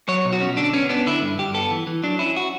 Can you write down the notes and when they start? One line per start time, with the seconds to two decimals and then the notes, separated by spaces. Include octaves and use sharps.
0.08 F#3 C#5
0.25 B2
0.33 F#4
0.41 C#4
0.57 D3 D4
0.73 B3 C#4
0.89 B3 D4
1.06 D3 E4
1.22 G2
1.39 G2 G4
1.54 B3 A4
1.71 E3
1.87 E3
2.03 F#3 D4
2.19 C#4 E4
2.37 F#4